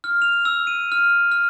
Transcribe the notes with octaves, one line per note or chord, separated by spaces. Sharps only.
F6
F7
E6
D#7
F6
F6